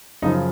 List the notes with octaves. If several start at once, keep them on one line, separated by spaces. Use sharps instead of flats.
F#2 C#3 F3 D#4